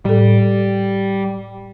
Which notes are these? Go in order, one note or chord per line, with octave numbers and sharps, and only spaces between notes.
A2 G3 A4